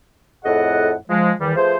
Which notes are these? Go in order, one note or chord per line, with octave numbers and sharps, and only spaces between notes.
F2 A2 G#4 A4 D#5 F#5
F3 G#3
E2 D#3 E3 G3
F3 A3 G#4 B4 C5